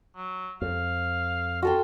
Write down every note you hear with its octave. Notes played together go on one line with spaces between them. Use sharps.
F#3
F2 F5
F4 F#4 A4 G5